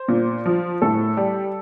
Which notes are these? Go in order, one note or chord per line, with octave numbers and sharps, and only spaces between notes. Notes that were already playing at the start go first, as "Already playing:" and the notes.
Already playing: C5
A#2
F3
A2 A4
G3